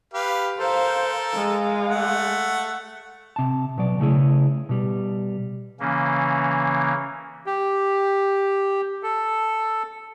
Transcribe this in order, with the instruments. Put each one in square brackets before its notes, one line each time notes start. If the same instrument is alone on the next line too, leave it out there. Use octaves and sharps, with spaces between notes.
[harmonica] G4 B4 F5
[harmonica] A4 A#4 [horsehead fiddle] C5 F5
[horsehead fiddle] G#3 F5
[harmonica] A3 F#5
[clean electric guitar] C3 A5
B2 F#3 D5
C#3 A3 E4 G#4
B2 G3
[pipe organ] C#3 E3 A#3 C#4
[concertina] G4
A4